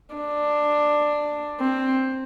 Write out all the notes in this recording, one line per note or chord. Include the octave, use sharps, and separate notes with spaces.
D4
C4